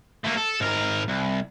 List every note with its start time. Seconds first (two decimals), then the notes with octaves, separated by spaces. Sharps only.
0.25 A3 A#3
0.38 A4
0.61 G#2 A#4
1.08 C2